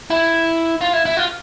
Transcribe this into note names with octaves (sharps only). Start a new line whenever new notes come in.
E4
F4
E4
E4
F4